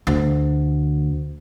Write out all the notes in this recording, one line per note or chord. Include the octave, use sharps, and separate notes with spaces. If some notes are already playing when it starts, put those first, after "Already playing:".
D2